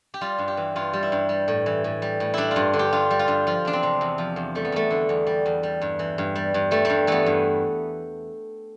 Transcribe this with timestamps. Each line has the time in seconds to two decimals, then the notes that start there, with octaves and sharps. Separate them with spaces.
0.14 G4
0.21 G3 F4
0.39 G2
0.48 G4
0.57 E3
0.76 G2 F4
0.93 G3
1.03 E4
1.12 G2
1.29 G3
1.48 A2
1.66 E3
1.84 A2
2.02 G3
2.20 A2
2.34 G3 D4 E4
2.51 F4
2.56 G2
2.73 D3
2.79 G4
2.93 G2 F4
3.11 G3
3.19 F4
3.28 G2
3.47 F3 F4
3.65 E2 D4
3.73 C4
3.83 C3
4.01 E2
4.18 F3
4.36 E2
4.55 G3 A3
4.65 B3
4.72 E2 A3
4.90 D3
5.09 E2
5.27 G3
5.46 E2
5.63 G3
5.82 G2
5.99 E3
6.18 G2
6.35 G3
6.54 G2
6.71 G3 A3
6.85 G2 G3
7.07 E3 A3 B3
7.26 G2